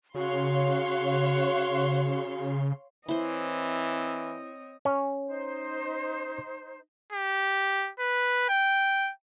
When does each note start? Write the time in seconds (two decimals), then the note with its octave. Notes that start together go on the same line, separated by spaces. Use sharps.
0.15 C#3 F#4 C#5 F5 C6
3.09 E3 C4 E4 C5 C#5 D#5
4.85 C#4
5.26 D#4 C5
7.12 G4
8.00 B4
8.49 G5